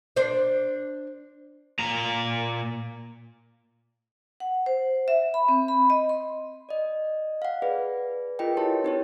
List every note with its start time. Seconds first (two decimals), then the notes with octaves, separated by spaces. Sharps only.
0.16 D4 C5 D5
1.79 A#2 A#5
4.40 F#5
4.66 C5
5.08 E5
5.34 B5
5.49 C4
5.68 B5
5.90 D#5
6.09 C6
6.69 D5 D#5
7.42 F5 F#5
7.62 G#4 B4 D5
8.39 F4 G#4 A#4 B4 D#5 G5
8.57 E4 G4 C#5 A5 C6
8.84 C4 D#4 E4 G4 C5 C#5